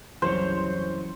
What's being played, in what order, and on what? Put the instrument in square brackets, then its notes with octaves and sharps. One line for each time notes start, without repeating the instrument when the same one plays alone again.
[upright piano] F#1 C2 G6 [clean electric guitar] E3 F#3 C#5 [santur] C5